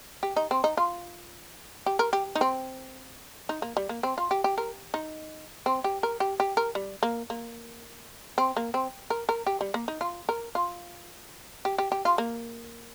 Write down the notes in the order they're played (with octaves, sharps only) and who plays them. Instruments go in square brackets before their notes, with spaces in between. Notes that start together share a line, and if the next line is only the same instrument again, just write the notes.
[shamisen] G4
D#4
C4
D#4
F4
G4
A#4
G4
D#4
C4
D#4
A#3
G3
A#3
C4
F4
G4
G4
A#4
D#4
C4
G4
A#4
G4
G4
A#4
G3
A#3
A#3
C4
A#3
C4
A#4
A#4
G4
G3
A#3
D#4
F4
A#4
F4
G4
G4
G4
F4
A#3